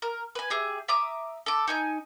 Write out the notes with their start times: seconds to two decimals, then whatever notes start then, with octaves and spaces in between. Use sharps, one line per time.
0.02 A#4
0.35 B4 G#5
0.50 G4 G#4 E5
0.88 E5 A#5 D6 D#6
1.46 A4 D6
1.68 D#4 G#5 G6